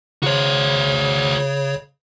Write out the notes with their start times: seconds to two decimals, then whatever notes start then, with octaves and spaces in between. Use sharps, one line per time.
0.23 C#3 F#4 C5 C#5